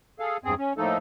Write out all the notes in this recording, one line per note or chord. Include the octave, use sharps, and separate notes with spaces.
G#4 A4 F5
E2 G2 C4 G#4
C#4
A2 F3 A3 A#3 D#4 A4